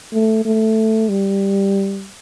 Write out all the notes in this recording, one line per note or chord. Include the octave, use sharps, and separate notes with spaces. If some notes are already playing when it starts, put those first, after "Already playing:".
A3
A3
G3